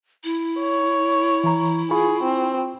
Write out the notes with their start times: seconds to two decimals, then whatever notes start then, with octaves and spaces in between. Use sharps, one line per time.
0.24 E4
0.59 C#5
1.44 E3 A#5
1.91 F4 G#4 B5 C#6
2.23 C4